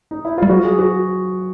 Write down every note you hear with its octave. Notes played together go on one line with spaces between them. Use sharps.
D#4
E4
G3 F4
F#3 F#4
G#4
F#4